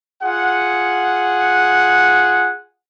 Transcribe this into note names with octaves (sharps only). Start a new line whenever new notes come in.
F4 G#4 F#5